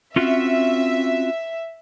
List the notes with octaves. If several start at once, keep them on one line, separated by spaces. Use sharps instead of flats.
C4 C#4 F4 F#4 E5